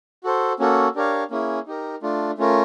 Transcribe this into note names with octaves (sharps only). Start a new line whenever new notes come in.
F#4 A4 C5
A#3 C#4 F#4 A4
D4 G4 A#4 C#5 F5
A#3 C#4 E4 G#4
D#4 G4 A#4
A3 D4 F4
A3 C#4 F4 A#4